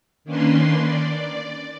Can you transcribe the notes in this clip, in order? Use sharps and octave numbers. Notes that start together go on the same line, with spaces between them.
D#3 A#3 C#4 D4 B4 C6
D5